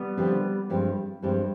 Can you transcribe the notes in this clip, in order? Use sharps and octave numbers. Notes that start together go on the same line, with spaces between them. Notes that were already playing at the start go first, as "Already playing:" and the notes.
Already playing: G3 B3
D3 F3 C4 G4 B4
G2 F3 G#3 C4 G4
G2 F3 G#3 C4 G4